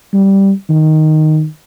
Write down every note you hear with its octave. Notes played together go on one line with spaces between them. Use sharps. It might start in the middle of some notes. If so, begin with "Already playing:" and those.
G3
D#3